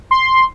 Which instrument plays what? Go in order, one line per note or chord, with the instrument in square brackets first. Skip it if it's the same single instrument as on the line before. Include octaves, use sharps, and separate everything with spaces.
[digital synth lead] C6